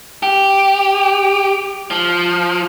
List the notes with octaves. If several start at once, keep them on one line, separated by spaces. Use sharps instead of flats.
G4
F3